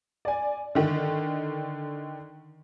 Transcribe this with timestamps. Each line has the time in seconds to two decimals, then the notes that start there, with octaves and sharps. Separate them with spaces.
0.25 D5 G#5
0.75 D3 D#3